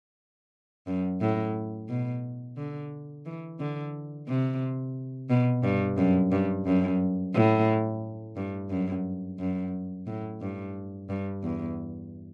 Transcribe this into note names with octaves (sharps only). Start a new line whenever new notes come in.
F#2
A2
B2
D3
E3
D3
C3
B2
G2
F#2
G2
F#2
A2
G2
F#2
F#2
A2
G2
G2
E2